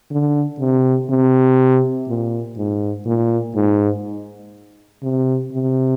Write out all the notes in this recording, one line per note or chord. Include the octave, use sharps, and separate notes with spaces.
D3
C3
C3
A#2
G#2
A#2
G#2
C3
C3